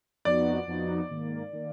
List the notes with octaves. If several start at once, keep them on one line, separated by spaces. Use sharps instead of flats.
F2 F3 B3 D#4 F#4 D5
F2 F3 B3 D#4 F#4
G#2 D#3 A#3
D#3 A#3